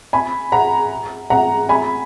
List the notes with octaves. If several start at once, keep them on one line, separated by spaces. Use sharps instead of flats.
G#5 B5
F#5 A#5
F#5 A#5
G#5 B5